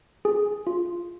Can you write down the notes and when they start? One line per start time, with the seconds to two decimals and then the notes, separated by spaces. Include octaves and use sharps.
0.25 G#4
0.67 F4